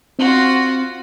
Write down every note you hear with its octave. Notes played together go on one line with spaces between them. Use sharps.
C4 F4 F#4